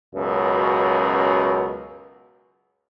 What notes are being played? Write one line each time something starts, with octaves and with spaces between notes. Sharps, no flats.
C#2 F#2 B2 C#4